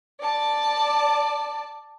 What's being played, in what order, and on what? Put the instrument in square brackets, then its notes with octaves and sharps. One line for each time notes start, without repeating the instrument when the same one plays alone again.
[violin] D5 A5